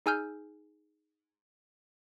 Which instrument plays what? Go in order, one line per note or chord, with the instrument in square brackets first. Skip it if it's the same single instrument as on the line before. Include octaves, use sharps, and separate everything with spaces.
[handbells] D#4 G#4 G#5 E6 F6 G6